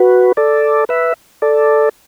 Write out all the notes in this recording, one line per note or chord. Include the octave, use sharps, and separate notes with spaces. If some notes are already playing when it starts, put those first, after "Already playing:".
Already playing: F#4 B4
A4 D5
B4 E5
A4 D5